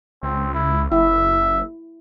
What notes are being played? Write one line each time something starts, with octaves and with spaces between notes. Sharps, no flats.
C#2 C4
E4
F#1 E4 E5